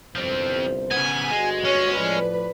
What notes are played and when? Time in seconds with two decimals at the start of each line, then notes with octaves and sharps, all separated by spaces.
0.15 G1 C2 F3 C4 C5
0.91 C#3 B3 G#5
1.30 G1 G#3 F#4
1.65 C#4 C#5
1.96 A2 F3 B4 D5